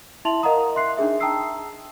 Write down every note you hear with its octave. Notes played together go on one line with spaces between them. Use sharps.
E4 E5 A5 C6 F7 F#7
A#4 D#5 F5 F#5 A#5 D#6
E5 C6 F#6 C7
D4 D#4 G#4 E5
G5 A5 A#5 D#6 E6 C7